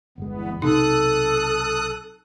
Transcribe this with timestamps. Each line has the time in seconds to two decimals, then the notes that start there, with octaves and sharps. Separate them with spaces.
0.18 G1 E2 G#3 B3
0.62 B1 C3 B3 D#4 A4 D#6 F#6